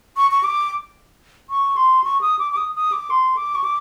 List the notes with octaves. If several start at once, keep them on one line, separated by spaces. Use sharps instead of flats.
C#6
C#6
D6
C#6
C6
C#6
D#6
D6
D6
D#6
D#6
D6
C6
D6
C#6
D6